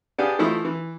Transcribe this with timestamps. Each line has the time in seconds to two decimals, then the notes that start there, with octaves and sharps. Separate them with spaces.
0.18 B3 D4 G4 G#4 F5 G#5
0.39 E3 F3 A3 E4 D#5 B5
0.65 E3